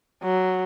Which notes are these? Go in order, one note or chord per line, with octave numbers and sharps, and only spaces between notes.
F#3